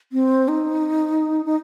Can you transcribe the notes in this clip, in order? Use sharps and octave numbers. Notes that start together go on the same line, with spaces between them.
C4
D#4
D#4